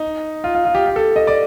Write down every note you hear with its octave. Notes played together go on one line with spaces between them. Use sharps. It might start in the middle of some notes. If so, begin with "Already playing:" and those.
Already playing: D#4
F4
F4
F4
G4
G4
A4
D#5
D5